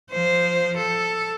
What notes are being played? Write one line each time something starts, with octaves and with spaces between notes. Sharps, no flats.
F3 C5
A4